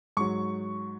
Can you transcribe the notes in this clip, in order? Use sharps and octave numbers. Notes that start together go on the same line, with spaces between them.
G#2 F#3 C#6